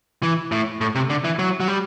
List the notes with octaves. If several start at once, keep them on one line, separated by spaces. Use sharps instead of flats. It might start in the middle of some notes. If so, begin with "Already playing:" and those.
E3
A2
A2
C3
D3
E3
F#3
F#3
G3